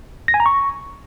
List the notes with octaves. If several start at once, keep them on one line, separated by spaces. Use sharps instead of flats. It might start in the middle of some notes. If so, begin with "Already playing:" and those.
A#6
G#5
A#5
C#6